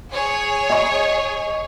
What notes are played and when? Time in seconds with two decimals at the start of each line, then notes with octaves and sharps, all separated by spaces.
0.11 G#4 C#5 G#5
0.70 D#5 C#6